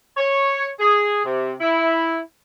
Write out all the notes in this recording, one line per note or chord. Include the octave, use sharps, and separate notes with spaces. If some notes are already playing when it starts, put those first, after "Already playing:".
C#5
G#4
C3
E4